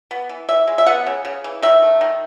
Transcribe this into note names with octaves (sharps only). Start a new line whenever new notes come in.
B3
E3
E3 E5
G#3
E5
B3 F#5
C#3
C#3
E3
D#3 E5
A3
D#3